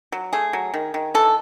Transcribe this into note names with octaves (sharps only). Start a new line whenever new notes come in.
F#3
A3 G#4
F#3
D#3
D#3
E3 A4